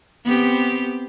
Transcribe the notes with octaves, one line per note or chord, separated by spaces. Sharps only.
B3 C4 G4